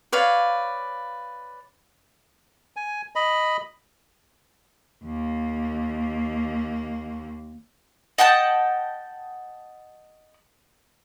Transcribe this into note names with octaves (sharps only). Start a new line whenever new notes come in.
B4 C#5 D5 F5
G#5
D#5 B5
D#2 A#3
D#5 F#5 G5 A5